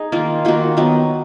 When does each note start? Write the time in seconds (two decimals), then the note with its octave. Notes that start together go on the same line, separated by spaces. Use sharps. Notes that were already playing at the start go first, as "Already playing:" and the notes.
Already playing: D#4 G#4
0.12 D#3 A#3 F4
0.45 D#3 A#3 F4 F#4
0.77 D#3 F#3 B3